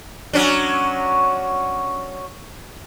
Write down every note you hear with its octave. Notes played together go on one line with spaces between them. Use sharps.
F#3 C#4 D4